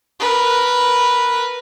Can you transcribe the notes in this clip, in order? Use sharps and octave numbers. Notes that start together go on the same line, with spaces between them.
A#4 B4